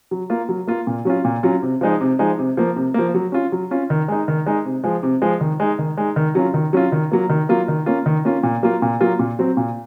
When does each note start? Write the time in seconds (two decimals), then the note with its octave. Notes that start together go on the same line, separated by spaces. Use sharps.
0.11 F#3
0.30 A#3 F4
0.49 F#3
0.67 A#3 F4
0.87 A#2
1.05 F#3 C#4 F4
1.25 A#2
1.43 F#3 C#4 F4
1.63 C3
1.81 F3 G#3 D#4
2.01 C3
2.19 F3 G#3 D#4
2.39 C3
2.57 F3 A#3
2.76 C3
2.94 F3 A#3
3.14 F#3
3.32 C#4 F4
3.52 F#3
3.71 C#4 F4
3.90 D#3
4.08 G#3 D#4
4.28 D#3
4.46 G#3 D#4
4.65 C3
4.84 F3 G#3
5.03 C3
5.22 F3 G#3
5.41 D#3
5.60 G#3 D#4
5.79 D#3
5.98 G#3 D#4
6.16 D#3
6.35 F#3 C#4 F4
6.54 D#3
6.73 F#3 C#4 F4
6.92 D#3
7.11 F#3 A#3 F4
7.30 D#3
7.49 F#3 A#3 F4
7.68 D#3
7.86 A#3 C#4 F4
8.06 D#3
8.25 A#3 C#4 F4
8.43 A#2
8.63 F#3 A#3 F4
8.82 A#2
9.00 F#3 A#3 F4
9.19 A#2
9.39 F#3 C4
9.57 A#2